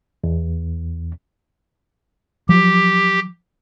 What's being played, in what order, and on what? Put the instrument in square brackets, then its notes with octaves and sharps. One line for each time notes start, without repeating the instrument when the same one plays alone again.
[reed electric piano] E2
[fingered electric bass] F3 F#3 [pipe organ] G4